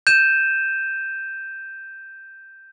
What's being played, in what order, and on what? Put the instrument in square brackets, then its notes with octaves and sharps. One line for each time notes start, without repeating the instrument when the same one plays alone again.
[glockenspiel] G6 D#7 E7